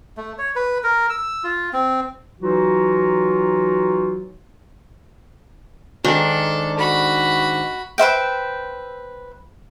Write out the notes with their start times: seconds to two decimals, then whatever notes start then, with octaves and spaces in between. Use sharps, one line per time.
0.17 A3
0.38 C#5
0.56 B4
0.83 A#4
1.10 E6
1.44 F4
1.73 C4
2.40 E3 F#3 D#4 F4 F#4
6.04 G#2 D#3 D4 A4
6.78 F#4 B5
7.98 B4 C5 E5 G5